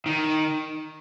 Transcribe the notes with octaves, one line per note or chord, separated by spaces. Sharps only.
D#3